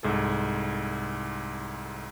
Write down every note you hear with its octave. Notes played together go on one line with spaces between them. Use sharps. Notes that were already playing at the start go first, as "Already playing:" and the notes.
C2 G#2 G#4 A4